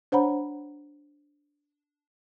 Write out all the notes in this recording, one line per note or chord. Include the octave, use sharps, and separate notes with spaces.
D4 C5 C#5 F#5 A#5 B5